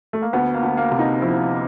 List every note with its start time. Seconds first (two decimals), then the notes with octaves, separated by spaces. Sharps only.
0.13 A3
0.22 A#3
0.33 D2 B3
0.54 A#3
0.63 D2
0.77 A#3
0.92 C3
0.99 D#4
1.22 F3 E4